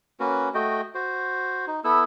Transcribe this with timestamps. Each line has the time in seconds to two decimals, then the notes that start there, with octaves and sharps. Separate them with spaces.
0.20 A#3 C#4 F#4 B4
0.54 A3 F#4 D#5 G5
0.95 F#4 C5
1.67 D#4
1.84 B3 E4 A4 E6